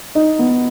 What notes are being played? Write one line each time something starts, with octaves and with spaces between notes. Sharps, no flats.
D#4
B3